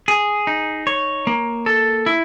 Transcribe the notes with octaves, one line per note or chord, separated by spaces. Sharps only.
G#4
D#4
C#5
A#3
A4
E4